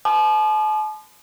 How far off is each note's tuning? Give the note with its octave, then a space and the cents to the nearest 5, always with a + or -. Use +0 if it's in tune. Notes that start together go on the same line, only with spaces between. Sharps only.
A5 -45 C6 -40 D#6 -45